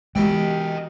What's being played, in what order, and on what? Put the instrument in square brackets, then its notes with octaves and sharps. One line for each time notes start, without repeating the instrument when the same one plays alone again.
[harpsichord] B2 E3 [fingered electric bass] G#3 [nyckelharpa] G4 [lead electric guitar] D#5 G5